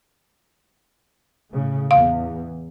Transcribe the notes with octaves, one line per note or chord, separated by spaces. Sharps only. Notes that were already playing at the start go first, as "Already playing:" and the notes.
A2 C#3
E2 F5